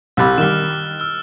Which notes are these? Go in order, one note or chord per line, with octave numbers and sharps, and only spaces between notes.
C2 G3 B5 E6 F#6 A6
D#3 G3 F6 E7
E6 F6